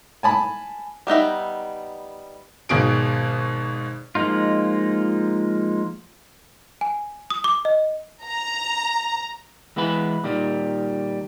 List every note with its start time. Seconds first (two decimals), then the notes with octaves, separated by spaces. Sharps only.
0.23 G#5 A5 B5
1.07 G3 B3 D#4 E5
2.69 G#1 B2 G#4 D7
4.15 F3 G#3 A#3 D#4 F4
6.81 G#5
7.30 D#6
7.44 D6
7.65 D#5
8.24 A#5
9.76 E3 G#3 B3 E4 B4
10.24 A#2 D#3 G3